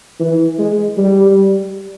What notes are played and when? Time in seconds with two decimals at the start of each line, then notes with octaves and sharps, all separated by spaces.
0.20 E3
0.59 G#3
0.97 G3